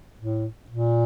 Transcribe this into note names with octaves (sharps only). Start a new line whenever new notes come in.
A2
A#2